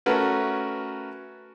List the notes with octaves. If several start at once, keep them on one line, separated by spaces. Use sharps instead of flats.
A3 C#4 F#4 A#4 B4